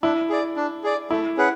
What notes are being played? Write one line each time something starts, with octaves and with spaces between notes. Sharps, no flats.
D4 E4
G#4 D5
D4
G#4 D5
A3 E4
C#4 G#4 B4 F#5